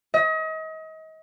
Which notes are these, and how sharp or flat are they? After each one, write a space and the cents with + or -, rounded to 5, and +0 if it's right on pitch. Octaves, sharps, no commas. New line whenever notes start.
D#5 +35